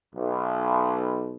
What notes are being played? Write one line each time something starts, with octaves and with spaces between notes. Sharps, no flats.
B1